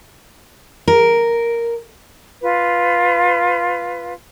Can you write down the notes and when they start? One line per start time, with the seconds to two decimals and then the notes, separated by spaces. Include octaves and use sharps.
0.87 A#4
2.41 F4 B4